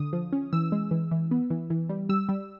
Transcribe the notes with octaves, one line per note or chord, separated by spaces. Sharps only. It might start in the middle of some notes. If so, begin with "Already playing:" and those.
Already playing: D3 D#6
F3
C#4
E3 E6
G#3
E3
E3
B3
E3
E3
G3
G3 E6
G3